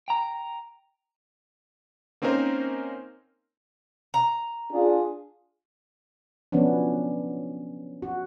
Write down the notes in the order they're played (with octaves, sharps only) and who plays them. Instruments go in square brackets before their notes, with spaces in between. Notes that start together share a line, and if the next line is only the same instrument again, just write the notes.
[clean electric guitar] G5 A#5
[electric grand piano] A#3 C4 C#4 D#4 A#4 C5
[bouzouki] A#5
[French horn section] D4 F4 G#4
[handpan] F3 F#3 B3 C#4 D4
F#4